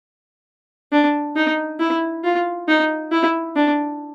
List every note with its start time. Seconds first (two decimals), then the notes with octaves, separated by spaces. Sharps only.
0.92 D4
1.36 D#4
1.80 E4
2.24 F4
2.68 D#4
3.12 E4
3.56 D4